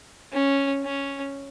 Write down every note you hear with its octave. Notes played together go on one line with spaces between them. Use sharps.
C#4
C#4